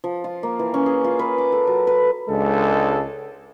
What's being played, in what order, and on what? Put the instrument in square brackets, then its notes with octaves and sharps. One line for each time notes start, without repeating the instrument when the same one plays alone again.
[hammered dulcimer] F3
F4
A#3
E3
C#4
G#4
F4
B4
D6
A4
F#3
B4
[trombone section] C#2 G#3 D4 A4